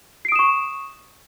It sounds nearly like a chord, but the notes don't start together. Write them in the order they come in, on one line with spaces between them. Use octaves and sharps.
C7 D7 D#6 E7 C#6